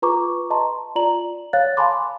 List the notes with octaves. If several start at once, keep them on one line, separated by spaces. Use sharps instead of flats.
F4 B4 A#5 C#6 D6
D#5 A5 A#5 C6
F4 D5 A#5 F#7
C#5 F5 F#6 A6
F5 G#5 A5 B5 C6 D6